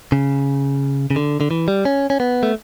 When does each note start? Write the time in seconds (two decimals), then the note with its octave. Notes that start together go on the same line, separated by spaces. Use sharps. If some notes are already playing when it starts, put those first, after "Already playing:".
0.12 C#3
1.10 C#3
1.16 D3
1.41 D3
1.51 E3
1.68 G3
1.85 C#4
2.10 C#4
2.20 B3
2.43 A3